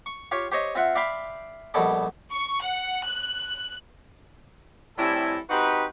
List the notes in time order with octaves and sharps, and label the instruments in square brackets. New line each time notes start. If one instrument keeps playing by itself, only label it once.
[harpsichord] C#6
F4 G4 C#5
G4 C5 C#5 D#5
C4 F4 E5 F#5
D5 E5 F5 G5 B5 C6
A#1 B2 G3 A4 D5
[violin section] C#6
F#5
F#6
[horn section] A2 C3 G3 E4 A4 G#5
C4 D#4 F#4 G4 B4